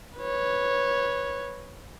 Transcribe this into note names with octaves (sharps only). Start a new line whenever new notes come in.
B4 C#5